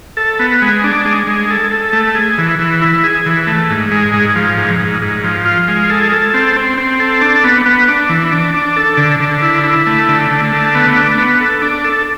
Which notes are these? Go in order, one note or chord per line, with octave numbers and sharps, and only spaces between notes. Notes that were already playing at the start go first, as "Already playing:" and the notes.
A4
B3
G#3
D4
G#3
G#3
A4
A4
A3
G#4
E3
E3
E4
G#4
E3
A3
G#2
G#3
G#2
F3
G#2
G#2
G#2
F3
F4
G#3
A4
A4
C4
C4
C4
A4
D4
B3
B3
D4
E3
D4
D4
A4
D3
D3
E4
E4
A3
D3
D3
A3
B3
D4
B3
A4
D4
A4